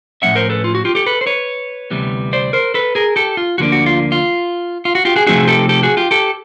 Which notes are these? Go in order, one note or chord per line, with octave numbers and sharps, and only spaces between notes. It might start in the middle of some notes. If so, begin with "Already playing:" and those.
A2 F3 A3 C#4 E5 F#5
A#4 C5
A4 B4
F4
F#4
F4 G4
G4 A4
A4 B4
C5
B4 C#5
D2 C3 E3 G3 B3
C5 D5
A#4 C5
A4 B4
G#4 A#4
G4 A4
F4
D2 D3 F3 A#3 D4 F#4
F#4
F4
F4
F4
F#4
F4 G4
F#4 G#4
C3 F3 A3 C4 D#4 F#4 G#4
G4 A4
G4 A4
F#4 G#4
F4 G4
G4 A4